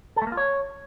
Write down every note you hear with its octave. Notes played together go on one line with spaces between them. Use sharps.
A4
A3
A#3
F4
C#5